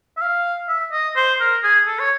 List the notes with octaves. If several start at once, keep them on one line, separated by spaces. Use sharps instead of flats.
E5
F5
E5
D#5
C5
A#4
G#4
A4
C#5